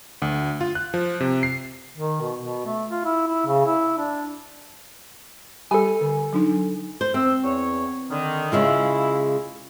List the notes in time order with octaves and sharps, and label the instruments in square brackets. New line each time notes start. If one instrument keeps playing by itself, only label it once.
[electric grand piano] D2
F4
F#6
F3
C3
C7
[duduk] D#3
B2
B2
A3
F4
E4
E4
C#3
E4
D4
[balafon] G3 G4 B5 [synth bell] A4 G#5
[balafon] D3
F#3 D4 D#4
[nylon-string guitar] C5
[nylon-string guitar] C4 [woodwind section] E6
[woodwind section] E2 C#5
D3 D#3
[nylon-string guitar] C#3 G#3 F4 [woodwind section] E4